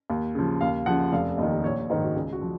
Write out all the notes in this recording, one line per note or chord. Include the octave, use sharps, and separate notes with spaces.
D#2
C#3 F3
D#2 F5
C#3 F3 F#5
F1 F5
D#2 D#3 D#5
A#1 C#5
G#2 D#3 C5
F#4
C#2 G#4
F#4
F3